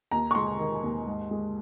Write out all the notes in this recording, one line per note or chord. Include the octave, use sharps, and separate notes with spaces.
D#2 A#5
C#6
G#3 C6
D#3
D#2
G#2
G#3